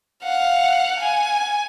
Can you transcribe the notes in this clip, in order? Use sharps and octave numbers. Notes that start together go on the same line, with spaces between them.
F5 F#5
G#5